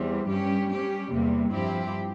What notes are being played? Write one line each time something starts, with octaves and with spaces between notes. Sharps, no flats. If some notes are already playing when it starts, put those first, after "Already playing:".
Already playing: E2 E3 G3 C4
G2 G3 C#4 G4
G3 C#4 G4
E2 C3 G3 A#3
G2 F3 C4 E4 G4